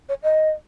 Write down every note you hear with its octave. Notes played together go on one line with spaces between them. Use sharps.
C#5
D#5